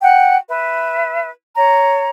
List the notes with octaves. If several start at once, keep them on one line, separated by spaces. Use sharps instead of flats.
F#5 G5
B4 E5
C#5 A#5